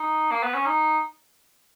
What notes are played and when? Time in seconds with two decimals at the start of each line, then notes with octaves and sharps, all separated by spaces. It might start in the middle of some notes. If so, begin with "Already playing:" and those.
Already playing: D#4
0.31 A#3
0.43 B3
0.54 C#4
0.66 D#4